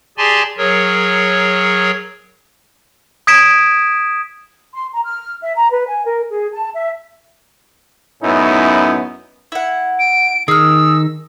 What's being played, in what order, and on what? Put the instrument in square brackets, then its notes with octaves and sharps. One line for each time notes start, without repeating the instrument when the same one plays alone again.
[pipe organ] G4 G#4 D5 G#5 A5 C6
F#3 G#4 A#4 C#5
[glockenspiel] D#6 G#6 B6 D7 E7
[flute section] C6
A#5
F6
E5
A#5
B4
G#5
A#4
G#4
A5
E5
[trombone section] F#2 A2 B3 C#4 D#4 E4
[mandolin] E4 F#5
[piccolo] D7
[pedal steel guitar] D#3 [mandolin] G#4 F6 [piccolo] E6